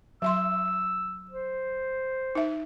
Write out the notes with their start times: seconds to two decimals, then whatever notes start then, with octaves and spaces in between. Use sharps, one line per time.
0.22 F#3 E5 C6 E6
1.31 C5
2.35 D#4 E5